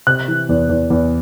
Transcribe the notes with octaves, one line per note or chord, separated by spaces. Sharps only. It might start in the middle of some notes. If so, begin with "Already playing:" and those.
C3 F#6
E3
E2
E2
E2